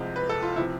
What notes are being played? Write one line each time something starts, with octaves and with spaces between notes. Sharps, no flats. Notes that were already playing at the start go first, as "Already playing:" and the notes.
Already playing: C2 C3 F3 G#3
B4
A4
F4
C3 F3 E4